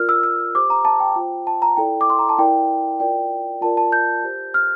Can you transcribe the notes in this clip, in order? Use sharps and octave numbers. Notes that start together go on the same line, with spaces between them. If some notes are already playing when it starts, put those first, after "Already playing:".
Already playing: F4 A#4 D5 F6
E6
E6
G4 C5 D6
A#5
A5
G5
F4 C5
A5
A#5
E4 A4 D5 G5
D6
C6
A#5
A5
E4 A#4 D5 G5
F4 A#4 D5 G5
F4 A#4 D5 A5
A5
G6
G4 C5
F6